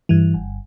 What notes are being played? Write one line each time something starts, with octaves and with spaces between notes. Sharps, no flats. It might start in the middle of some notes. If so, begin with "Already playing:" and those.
G2 E3
G1